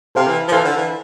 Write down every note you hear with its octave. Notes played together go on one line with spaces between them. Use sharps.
C3 A4 C5 F5
E3
F3
E3 A4 C5 F5
D3
E3